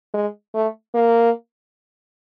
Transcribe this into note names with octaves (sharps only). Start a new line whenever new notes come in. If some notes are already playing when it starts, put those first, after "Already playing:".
G#3
A3
A#3